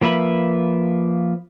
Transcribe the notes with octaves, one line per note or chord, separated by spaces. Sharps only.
F3 A#3 B4 E5 B5